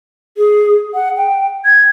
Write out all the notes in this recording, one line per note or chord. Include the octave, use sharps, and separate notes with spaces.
G#4
F#5
G5
G#6